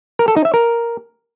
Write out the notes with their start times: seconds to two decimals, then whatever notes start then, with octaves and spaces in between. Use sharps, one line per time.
0.19 A#4
0.28 A4
0.36 D#4
0.45 E5
0.54 A#4